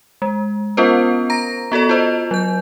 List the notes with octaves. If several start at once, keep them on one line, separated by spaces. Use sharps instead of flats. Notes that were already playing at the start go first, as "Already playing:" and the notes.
G#3
B3 C#4 F4 A#4 C5
A#5 A#6
B3 F#4 A4 D5
F4 C5 D#5
F#3 G6